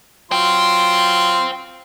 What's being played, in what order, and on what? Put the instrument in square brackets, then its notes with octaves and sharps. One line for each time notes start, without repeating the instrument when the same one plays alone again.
[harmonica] F#3 F4 C6 [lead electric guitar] C5 G5